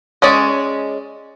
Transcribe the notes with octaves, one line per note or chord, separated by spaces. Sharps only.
G#3 C#4 D5